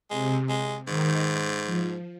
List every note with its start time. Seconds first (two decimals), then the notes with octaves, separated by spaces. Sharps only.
0.10 C3 G#3
0.49 G#3
0.87 G#2 D#3
1.65 F3